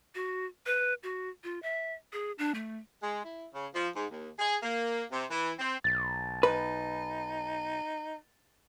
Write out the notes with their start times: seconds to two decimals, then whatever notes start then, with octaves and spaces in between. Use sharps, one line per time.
0.15 F#4
0.66 B4
1.03 F#4
1.44 F4
1.62 E5
2.13 G#4
2.39 D4
2.55 A3
3.03 G#3
3.24 E4
3.53 C#3
3.74 F3
3.96 G#2
4.11 D#2
4.39 G#4
4.62 A#3
5.12 C3
5.30 E3
5.59 C4
5.84 B1 A6
6.43 D#4 B4